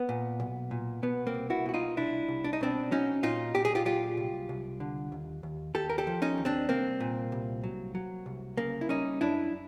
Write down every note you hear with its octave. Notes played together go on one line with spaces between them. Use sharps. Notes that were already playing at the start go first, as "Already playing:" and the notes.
Already playing: B3
A#2
B1
A#2
B2 B3
A#3 C4
C2
E4 F#4
B2 F#4
D#4 F4
C2 D4 E4
C2
D4
D#4
B2 C4 D4
F#3 C#4 D#4
A#2 D#4 F4
A#2 G4
G#4
F4 G4
F#3 F4 G4
C2
C2
D3
D#2
D#2
D#2 G4 A4
A#4
G4 A4
F3
C#4 D#4
D#2
C4 D4
C2 A#3 C4
A#2
C2
F#3
F#3
C2
C#3 A#3
E4
G3 C#4 D#4
F#2 D4 E4